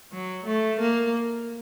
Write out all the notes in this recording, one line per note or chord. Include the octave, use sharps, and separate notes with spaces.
F#3
A3
A#3